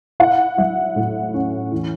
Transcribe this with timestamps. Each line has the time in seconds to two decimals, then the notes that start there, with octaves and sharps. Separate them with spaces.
0.20 E4 F#5
0.58 F#3 E5
0.96 A2
1.34 C#4
1.72 E3